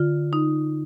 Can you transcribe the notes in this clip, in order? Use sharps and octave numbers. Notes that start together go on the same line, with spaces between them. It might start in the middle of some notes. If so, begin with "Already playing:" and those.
Already playing: D3 F4
D#4